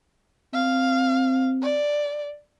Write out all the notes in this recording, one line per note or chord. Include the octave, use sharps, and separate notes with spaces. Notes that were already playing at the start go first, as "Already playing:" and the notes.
C4 F5
D5